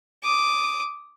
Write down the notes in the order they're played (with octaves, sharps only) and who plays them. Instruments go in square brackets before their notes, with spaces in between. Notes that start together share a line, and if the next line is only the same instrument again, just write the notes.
[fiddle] D6 D#6